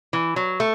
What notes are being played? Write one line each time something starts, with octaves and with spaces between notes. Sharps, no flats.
E3
F#3
A3